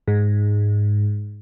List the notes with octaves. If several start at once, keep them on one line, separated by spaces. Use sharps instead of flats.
G#2